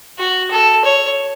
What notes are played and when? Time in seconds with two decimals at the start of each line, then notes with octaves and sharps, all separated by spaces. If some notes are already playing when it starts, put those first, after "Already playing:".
0.19 F#4
0.51 A4
0.85 C#5